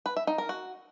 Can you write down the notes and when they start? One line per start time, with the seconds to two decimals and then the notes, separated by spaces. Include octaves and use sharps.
0.06 B4
0.16 E5
0.27 D#4
0.38 A#4
0.49 F#4